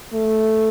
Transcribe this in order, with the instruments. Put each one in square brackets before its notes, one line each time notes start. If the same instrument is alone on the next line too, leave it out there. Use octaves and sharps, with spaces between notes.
[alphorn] A3